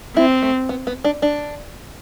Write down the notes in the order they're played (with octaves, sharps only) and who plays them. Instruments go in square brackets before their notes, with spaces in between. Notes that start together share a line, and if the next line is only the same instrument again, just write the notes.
[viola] C4 [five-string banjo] E4
[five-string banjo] A3
B3
B3
D4
D4